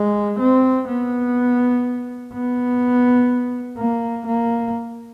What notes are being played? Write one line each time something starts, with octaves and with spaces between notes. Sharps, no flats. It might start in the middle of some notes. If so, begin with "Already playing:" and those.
Already playing: G#3
C4
B3
B3
A#3
A#3